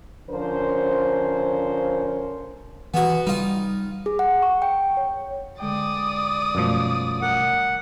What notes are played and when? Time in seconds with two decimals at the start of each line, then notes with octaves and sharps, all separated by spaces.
0.29 D3 F3 C#4 A#4 C5
2.94 E3 B3 F#4
3.27 G3 D#4 F4
4.06 G#4
4.19 F#5
4.42 C#6
4.62 G5
4.97 C#5
5.60 D3 G#3 D5 G5 D#6
6.55 F#2 B2 D#3 F3 G3 A3
7.22 A#4 F#5